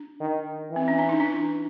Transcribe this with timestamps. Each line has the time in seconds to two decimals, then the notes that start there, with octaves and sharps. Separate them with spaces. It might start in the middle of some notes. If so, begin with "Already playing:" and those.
Already playing: D4
0.20 D#3
0.71 E3
0.76 C4
0.88 C#4
0.99 D4
1.09 D#4
1.20 D4 E4